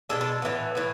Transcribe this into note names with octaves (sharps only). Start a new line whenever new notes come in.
B2 G#3 D4 A4
A4
A2 E3 B3
A2 E3 B3